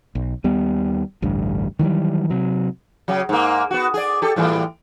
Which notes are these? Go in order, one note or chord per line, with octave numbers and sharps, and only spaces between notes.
B1
D#2 G3 B3
A1 D2 G2
D#3 E3 F#3 G3
C3 F#3
C#3 F#3
G#2 A#3
B3 F#4
G#4 D5
G4 A4
A2 E3 G3